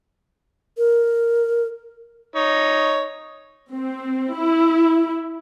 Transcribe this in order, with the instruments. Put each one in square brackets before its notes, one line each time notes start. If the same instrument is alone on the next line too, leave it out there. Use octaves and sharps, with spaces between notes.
[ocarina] A#4
[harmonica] D#4 C#5
[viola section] C4
E4